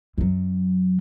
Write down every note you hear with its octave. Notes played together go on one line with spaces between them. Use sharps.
F#2 F#3